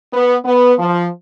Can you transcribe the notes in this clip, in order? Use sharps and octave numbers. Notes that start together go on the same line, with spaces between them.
B3
B3
F3